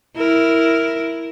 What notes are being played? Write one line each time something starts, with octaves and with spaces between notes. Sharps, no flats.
E4 A#4